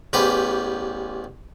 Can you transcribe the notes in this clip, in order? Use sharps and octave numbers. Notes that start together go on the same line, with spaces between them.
A1 E2 G4 B4 C5